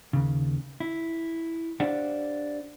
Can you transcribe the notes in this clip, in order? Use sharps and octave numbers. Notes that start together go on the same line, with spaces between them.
D#2 C#3
E4
D4 G4 C5 D5 F5 F#5